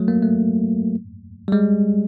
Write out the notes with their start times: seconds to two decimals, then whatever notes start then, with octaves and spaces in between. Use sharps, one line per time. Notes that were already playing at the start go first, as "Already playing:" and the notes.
Already playing: F#3 A3
0.08 A#3
0.23 A3
1.48 G3
1.52 G#3